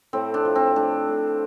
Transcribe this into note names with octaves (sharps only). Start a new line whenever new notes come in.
A2 C4
D4
F3
C4
A3 D4
A2